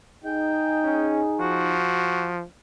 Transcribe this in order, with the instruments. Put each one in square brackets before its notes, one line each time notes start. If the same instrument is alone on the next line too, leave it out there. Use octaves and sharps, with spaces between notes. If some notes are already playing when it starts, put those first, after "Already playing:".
[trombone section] D#4 G#4 [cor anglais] G5
[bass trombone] C#4
[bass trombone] F3 [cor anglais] F#4